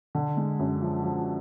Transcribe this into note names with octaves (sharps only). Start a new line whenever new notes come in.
D3
G#3
F#2
F3
F3